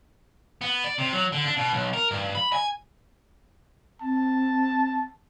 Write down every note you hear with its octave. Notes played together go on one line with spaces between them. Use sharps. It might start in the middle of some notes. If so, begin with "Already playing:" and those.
B3
D5
C3
F#3
D3
D4
B2
B1
A#4
G2
B5
G#5
C4 A5